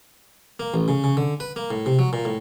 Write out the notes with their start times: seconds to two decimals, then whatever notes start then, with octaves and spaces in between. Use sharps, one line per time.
0.60 A#3
0.74 A1
0.88 C#3
1.04 C#3
1.17 D3
1.40 B4
1.56 A#3
1.71 A2
1.86 C3
1.99 F#3
2.13 A#2
2.25 A2